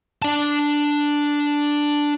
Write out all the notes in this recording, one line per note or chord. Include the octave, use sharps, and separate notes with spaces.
D4 A5